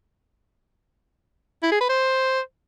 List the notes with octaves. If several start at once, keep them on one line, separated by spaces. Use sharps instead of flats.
E4
G#4
B4
C5